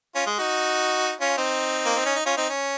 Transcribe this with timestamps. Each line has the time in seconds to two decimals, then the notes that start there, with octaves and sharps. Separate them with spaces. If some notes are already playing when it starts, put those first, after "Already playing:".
0.15 C#4 F4
0.27 G#3
0.39 D#4 F#4
1.21 C#4 F4
1.38 C4 D#4
1.85 A#3
1.95 C4
2.06 C#4
2.15 D#4
2.26 C#4 F4
2.37 C4 D#4
2.50 C#4